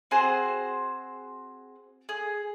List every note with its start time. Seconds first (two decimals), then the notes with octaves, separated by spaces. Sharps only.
0.11 C4 F#4 G#4 C5
2.09 G#4